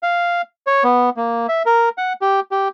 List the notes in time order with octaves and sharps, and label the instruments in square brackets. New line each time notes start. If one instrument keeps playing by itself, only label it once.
[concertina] F5
C#5
B3
A#3
E5
A#4
F#5
G4
G4